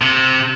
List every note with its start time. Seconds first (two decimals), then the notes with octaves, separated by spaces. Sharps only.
0.02 C3